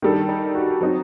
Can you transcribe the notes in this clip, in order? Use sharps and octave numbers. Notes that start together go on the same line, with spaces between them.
D#3 G3 D4 D#4 A4
D#4
F#4
F#3 C4 D#4